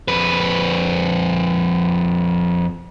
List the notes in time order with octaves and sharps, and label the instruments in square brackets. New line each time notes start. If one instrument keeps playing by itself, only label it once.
[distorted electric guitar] F2 B4